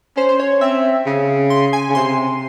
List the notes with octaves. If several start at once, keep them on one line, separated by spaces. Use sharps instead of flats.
C#4 C5
C5
C#5
C4 E5
C#3
C6
G#5
C#3
C3 C6